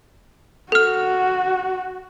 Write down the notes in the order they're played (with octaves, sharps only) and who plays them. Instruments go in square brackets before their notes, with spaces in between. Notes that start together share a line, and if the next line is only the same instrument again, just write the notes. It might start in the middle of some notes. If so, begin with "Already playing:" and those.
[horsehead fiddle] F#4 [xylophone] A4 F6